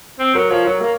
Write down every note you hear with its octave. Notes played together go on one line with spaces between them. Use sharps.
C4
F#3 A#4
F3 C#5
F#3 C#5
A#3